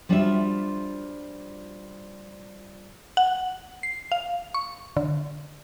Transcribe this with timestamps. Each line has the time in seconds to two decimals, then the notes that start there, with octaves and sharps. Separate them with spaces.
0.09 F3 G3 D4 F4 F#4 E5
3.17 F#5
3.83 C7
4.12 F5
4.54 C#6
4.97 D3